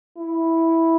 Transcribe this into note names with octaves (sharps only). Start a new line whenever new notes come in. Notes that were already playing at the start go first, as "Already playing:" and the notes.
E4